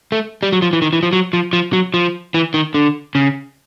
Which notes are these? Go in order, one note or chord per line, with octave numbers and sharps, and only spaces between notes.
A3
G3
F#3
F3
E3
D#3
E3
F3
F#3
F3
F3
F#3
F3
E3
D#3
D3
C#3